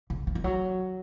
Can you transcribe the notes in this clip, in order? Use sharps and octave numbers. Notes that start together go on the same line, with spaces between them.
C#3
C#3
D#3
F#3